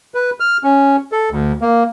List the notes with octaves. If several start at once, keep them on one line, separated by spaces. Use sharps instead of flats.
B4
F6
C#4
A4
D2
A#3